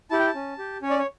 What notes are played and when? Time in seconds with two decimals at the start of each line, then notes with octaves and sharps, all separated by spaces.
0.11 E4 G4 A5
0.19 G5
0.26 A5
0.35 C#4
0.59 G4
0.82 C#4 C#5
0.90 D5
0.99 C#5